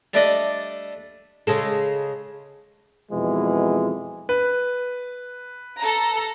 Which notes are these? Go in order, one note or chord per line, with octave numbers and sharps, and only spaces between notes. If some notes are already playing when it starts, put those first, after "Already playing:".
G3 A3 D4 D5 D#5
C#3 G#3 A4
F2 B2 E3 G#3
B4
A4 A#5